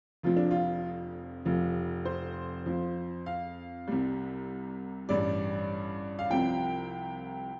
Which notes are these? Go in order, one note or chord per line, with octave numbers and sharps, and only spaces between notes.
F1 F2 F3 F4
D4
F4
F1 F2 F3
C5
F2 F3
F5
C2 C3 G3
A1 G2 G3 D5
F5
C2 C3 F3 G5